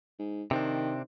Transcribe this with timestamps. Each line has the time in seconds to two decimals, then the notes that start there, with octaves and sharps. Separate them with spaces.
0.19 G#2
0.51 C3 D#3 C4 D4